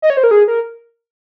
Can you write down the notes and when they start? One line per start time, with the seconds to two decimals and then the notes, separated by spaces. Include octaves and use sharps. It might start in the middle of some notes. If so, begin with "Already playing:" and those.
0.02 D#5
0.10 C#5
0.17 C5
0.24 A#4
0.31 G#4
0.48 A#4